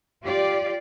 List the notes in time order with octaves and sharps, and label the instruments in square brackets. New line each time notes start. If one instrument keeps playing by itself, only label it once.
[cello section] F4 G4 D5